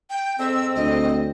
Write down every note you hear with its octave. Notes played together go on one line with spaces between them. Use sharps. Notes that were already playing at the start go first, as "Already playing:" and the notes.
G5
F2 G#2 C4 E6
D2 D#5